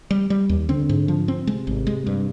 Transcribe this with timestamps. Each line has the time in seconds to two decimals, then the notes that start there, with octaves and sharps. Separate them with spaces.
0.11 G3
0.30 G3
0.49 D#2
0.69 D3 C4
0.89 G#2
1.08 F3
1.28 C4
1.47 C3 G#3
1.67 G#1
1.87 G#3
2.07 G2